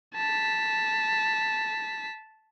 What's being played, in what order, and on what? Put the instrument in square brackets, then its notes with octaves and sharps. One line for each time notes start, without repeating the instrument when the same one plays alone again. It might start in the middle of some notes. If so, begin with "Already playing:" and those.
[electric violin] A5 B6